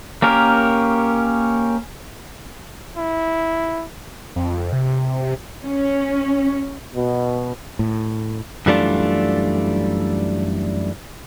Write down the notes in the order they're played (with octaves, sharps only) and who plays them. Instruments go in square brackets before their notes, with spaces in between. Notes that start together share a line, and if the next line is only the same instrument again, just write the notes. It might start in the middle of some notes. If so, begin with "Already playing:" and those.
[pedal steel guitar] A#3 C#4 G4 A#4
[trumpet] E4
[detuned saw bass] F2
C3
[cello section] C#4
[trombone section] B2
[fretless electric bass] A2
[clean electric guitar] F#2 E3 G3 A3 D4 F4